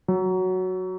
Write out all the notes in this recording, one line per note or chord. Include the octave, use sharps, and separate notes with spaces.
F#3